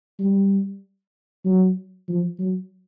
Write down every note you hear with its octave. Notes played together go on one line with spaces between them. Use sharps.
G3
F#3
F3
F#3